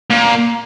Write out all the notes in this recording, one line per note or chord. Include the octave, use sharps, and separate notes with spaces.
A#2